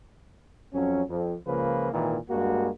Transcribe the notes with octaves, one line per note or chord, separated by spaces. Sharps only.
F2 F#3 C#4
F2
C#2 C#3 F3 A#3 B4
G#1 A#2 D#3 E3
G2 G#3 A#3 F#4